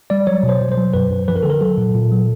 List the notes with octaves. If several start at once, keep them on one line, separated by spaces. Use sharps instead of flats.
G3 D5
F#3 C#5
B2
C5
B2
C5
F#3
F#2 B4
F#2
F3 B4
A#4
D3 A4
A#4
F#3 A4
A#2
A#2
F#3